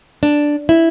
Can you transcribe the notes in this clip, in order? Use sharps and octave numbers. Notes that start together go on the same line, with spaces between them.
D4
E4